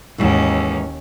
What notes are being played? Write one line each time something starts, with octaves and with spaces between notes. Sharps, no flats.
D#2 G#2 E3 C#4